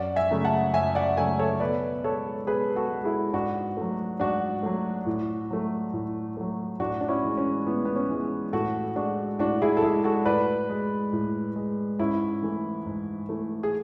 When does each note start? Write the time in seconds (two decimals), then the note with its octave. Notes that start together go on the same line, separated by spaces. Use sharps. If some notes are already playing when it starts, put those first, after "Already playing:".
Already playing: F#2 D5 F#5
0.16 E5 G#5
0.31 C#3 F#3 A3
0.45 F#5 A5
0.73 F#2 E5 G#5
0.95 D5 F#5
1.17 C#3 F#3 A3 E5 G#5
1.39 A4 C#5
1.60 B2 B4 D5
2.04 G#3 A4 C#5
2.47 B2 G#4 B4
2.76 F#4 A4
2.91 G#3
3.04 E4 G#4
3.33 G#2 D4 F#4
3.77 F#3 A3
4.20 G#2 D4 F#4
4.63 F#3 A3
5.06 A2
5.51 F#3 A3
5.93 A2
6.37 F#3 A3
6.80 A2 D4 F#4
7.01 D4
7.08 C#4 E4
7.23 E3 G#3
7.37 C#4
7.66 A2 B3
7.85 B3
7.95 C#4
8.09 E3 G#3
8.53 A2 F#4 A4
8.96 G#3 D4 F#4
9.39 A2 D4 F#4
9.62 E4 G#4
9.77 A4
9.83 G#3 E4 G#4
10.04 F#4 A4
10.26 A2 B4 D5
10.69 G#3
11.13 A2
11.56 G#3
11.99 G#2 C#4 E4
12.43 E3 A3
12.86 G#2
13.29 E3 A3
13.63 G#4